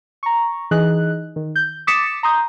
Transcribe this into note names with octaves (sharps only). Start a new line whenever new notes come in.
A#5 C#6
E3 D#4 G#4 D#5 F#6
D#3
G6
D6 D#6 A6 B6 C#7 E7
A#5 C6 D#6 G6